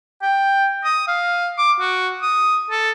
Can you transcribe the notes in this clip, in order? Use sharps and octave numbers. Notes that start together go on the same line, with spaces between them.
G5
D#6
F5
D6
F#4
D#6
A4